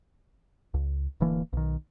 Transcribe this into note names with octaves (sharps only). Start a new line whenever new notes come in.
C#2
D1 D2 E3 A#3
B1 D#3